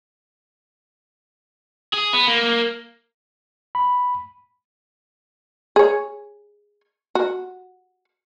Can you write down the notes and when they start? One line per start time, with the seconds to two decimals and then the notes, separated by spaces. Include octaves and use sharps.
1.94 G#4
2.13 B3
2.28 A#3
3.75 B5
5.76 G#4 C#5
7.15 F#4